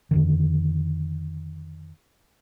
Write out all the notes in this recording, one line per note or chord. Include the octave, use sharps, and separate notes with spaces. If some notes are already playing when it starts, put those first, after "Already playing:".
F2 D3 D#3